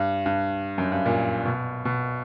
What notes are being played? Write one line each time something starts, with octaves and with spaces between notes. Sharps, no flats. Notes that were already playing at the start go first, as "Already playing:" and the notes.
Already playing: G2
G2
F#2
G2
A#2
B2
B2